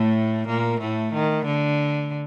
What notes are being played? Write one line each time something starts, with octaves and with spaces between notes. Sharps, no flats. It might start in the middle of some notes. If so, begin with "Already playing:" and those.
Already playing: A2 A3
A#2 A#3
A2 A3
D#3
D3